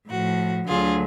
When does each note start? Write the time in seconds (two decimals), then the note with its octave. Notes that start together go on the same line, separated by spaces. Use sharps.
0.09 A2 F3 F#4
0.68 D2 D3 F#3 F4 G#4